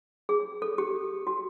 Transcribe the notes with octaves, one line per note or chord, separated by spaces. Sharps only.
G#4
A4
G4
F#4